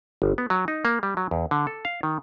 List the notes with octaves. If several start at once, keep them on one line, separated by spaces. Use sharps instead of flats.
G1
B3
F#3
D#4
A#3
G3
F#3
E2
D3
A4
F5
D#3